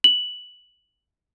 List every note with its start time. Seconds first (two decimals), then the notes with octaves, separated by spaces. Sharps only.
0.04 F#7